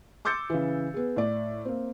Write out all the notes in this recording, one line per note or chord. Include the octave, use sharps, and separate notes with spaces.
C6 D6 E6 G6 A6 C#7
C#3 E3
B3 G#4
A2 D5
A#3 C4